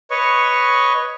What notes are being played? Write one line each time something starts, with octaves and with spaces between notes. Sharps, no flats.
B4 C#5 D#5 C#6